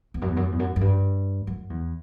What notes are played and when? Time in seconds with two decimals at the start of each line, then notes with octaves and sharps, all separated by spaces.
0.14 E2
0.22 F#2
0.30 E2
0.37 F#2
0.52 E2
0.59 F#2
0.76 F#2
0.81 G2
1.47 F#2
1.70 E2